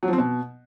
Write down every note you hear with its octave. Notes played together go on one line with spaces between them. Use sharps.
F#3
F3
C4
B2